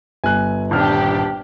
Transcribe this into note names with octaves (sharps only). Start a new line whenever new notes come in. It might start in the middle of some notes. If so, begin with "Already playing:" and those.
G1 G#5 F#6
D#1 D4 G4 F6